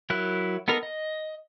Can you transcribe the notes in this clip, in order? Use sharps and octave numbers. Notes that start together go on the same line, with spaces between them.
F#3 E4 A#4 F#6
B3 D#4 A4 A#4
D#5